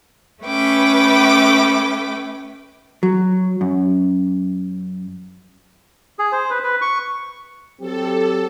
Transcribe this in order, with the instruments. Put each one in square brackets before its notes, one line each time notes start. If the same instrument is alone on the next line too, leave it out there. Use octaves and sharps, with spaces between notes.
[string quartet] A3 C#4 B4 G5 D6
[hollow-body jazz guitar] F#3
F#2
[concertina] G#4
C5
B4
B4
C#6
[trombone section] F#3 C4 G4 [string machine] A4